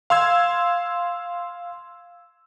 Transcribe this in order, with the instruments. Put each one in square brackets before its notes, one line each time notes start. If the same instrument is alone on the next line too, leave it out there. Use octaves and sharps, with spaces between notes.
[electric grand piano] F5 C6 E6 G#6